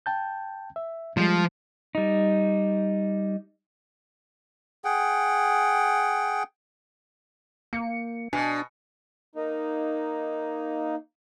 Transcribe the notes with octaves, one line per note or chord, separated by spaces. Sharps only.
G5 A5 G6
E5
F3 G3 G#3
G3 D#4
G#4 F#5 G5
A#3 C#7
B2 D4 G#5
A#3 D#4